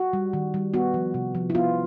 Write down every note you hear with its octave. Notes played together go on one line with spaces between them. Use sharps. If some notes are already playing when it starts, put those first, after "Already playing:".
Already playing: F#4
G3
D#3
G3
B3 F#4
F3
C3
F3
E4
B3 F4